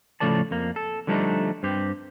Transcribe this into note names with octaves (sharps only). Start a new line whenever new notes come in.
A2 C#3 F3 A3 D5 A5
F2 A#3
A4
D3 F3 G3 A3 D4 D#4
G2 C4 G4